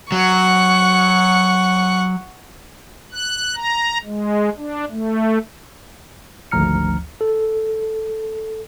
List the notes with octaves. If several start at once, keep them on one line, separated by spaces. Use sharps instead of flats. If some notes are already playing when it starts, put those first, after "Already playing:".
F#3 F#5 C#6
F#6
A#5
G#3
D4
A3
G#1 D2 F3 A#5 F6 C#7
A4